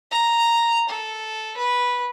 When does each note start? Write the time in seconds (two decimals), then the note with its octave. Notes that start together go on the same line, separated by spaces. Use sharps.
0.11 A#5
0.89 A4
1.57 B4